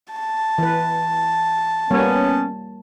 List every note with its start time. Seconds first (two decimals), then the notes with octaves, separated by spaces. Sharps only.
0.12 A5
0.58 E3 B4
1.91 G3 A#3 B3 C#4 C#5